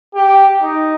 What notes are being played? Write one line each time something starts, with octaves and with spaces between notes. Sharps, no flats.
G4
D#4